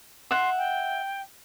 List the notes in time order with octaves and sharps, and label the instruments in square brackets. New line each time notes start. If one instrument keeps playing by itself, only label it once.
[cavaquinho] E5 F#5 [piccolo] C6
[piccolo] G5